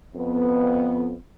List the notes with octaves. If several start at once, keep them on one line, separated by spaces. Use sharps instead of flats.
F2 B3